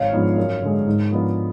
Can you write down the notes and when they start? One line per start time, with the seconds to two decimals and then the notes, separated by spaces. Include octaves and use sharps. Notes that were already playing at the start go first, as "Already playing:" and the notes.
Already playing: G#1 C#5 F5
0.12 G#2 F3 B3 D4
0.37 F#2
0.62 D3 G#3
0.87 G#2
1.11 F3 B3 D4